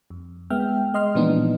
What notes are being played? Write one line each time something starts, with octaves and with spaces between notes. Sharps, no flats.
F2
G#3 B3 E5 G5 F6
G#3 D#5 C6 F6
A#2 E3 F3 B3 D4 D#4